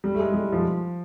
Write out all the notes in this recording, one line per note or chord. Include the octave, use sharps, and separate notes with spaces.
G3
A3
G#3
G3
F3